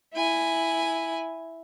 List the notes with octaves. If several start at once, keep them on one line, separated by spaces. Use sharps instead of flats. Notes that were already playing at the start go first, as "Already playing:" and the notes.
E4 G#5